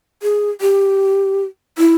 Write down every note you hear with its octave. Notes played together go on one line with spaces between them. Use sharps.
G#4
G4
E4